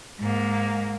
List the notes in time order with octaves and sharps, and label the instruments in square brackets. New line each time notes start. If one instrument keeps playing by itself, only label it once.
[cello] G#2 A#3